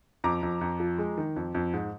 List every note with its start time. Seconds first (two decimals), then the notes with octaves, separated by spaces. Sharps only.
0.24 F2 A#5 D6
0.43 F2
0.61 F2
0.80 F3
0.98 G#3
1.18 D#3
1.36 F2
1.54 F2
1.73 G#2